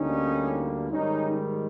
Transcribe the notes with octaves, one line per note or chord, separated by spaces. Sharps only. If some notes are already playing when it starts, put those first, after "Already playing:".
Already playing: D2 D3 G3 A#3 C#4 D#4
G#2 D#3 G3 C#4 D#4